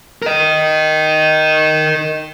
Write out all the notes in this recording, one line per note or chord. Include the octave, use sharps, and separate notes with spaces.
A#4 D#5